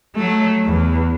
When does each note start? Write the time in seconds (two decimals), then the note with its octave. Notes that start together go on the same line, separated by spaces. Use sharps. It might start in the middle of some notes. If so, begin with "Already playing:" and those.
0.16 F#3 A3
0.65 E2